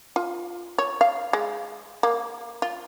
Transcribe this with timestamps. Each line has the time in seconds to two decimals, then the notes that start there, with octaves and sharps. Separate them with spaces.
0.16 F4
0.78 C#5
1.01 F5
1.33 G#3
2.03 A#3
2.62 F4